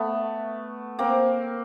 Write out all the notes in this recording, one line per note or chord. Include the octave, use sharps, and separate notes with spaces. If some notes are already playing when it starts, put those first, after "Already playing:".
Already playing: A3 B3
A#3 C4